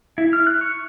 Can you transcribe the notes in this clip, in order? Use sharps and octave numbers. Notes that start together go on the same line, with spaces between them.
E4
F6
F#6
C#6